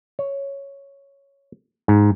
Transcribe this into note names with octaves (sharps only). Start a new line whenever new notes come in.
C#5
G#2